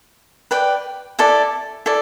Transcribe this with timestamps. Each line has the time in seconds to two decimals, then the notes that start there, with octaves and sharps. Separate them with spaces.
0.51 B4 D5 G5
1.19 E4 A4 D5
1.86 E4 A4 D5